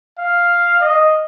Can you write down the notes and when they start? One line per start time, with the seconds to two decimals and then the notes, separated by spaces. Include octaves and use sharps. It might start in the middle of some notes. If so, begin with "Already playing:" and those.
0.19 F5
0.81 D#5